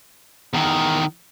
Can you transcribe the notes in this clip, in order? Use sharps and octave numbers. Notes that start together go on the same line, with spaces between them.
E2 D#3